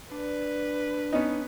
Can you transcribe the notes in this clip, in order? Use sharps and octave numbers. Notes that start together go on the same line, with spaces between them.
D4 B4
B3 C#4 D#4